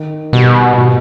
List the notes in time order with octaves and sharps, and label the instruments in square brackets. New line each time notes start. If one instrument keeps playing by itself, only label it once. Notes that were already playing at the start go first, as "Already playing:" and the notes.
Already playing: [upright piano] D#3
[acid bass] B2 [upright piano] G3
[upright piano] B2